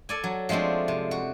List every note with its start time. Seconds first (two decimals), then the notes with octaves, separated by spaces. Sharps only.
0.09 A4 D5 G#5
0.24 F#3
0.49 F3 G#3 A3 C4 D4
0.88 C3
1.11 F#4